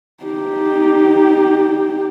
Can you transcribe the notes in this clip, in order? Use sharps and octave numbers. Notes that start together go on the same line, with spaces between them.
D#4 G4